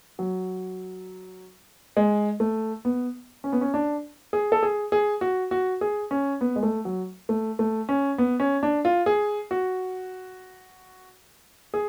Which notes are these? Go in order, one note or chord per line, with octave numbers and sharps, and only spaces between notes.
F#3
G#3
A3
B3
C#4
B3
C#4
D4
G#4
A4
G#4
G#4
F#4
F#4
G#4
C#4
B3
G#3
A3
F#3
A3
A3
C#4
B3
C#4
D4
F4
G#4
F#4
G#4